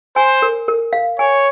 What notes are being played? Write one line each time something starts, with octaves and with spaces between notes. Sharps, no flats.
C5 G#5
A#4
A#4
F5
C#5 G#5